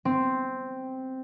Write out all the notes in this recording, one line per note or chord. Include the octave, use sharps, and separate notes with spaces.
C4